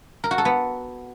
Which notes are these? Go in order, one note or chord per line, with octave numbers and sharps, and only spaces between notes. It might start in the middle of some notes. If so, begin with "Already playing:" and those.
A#4
F#4
A4
B3